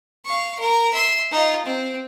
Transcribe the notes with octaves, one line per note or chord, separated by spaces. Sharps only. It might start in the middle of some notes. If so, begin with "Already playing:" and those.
F5 C#6
A#4 A#5
E5 C6
D#4 F4
C4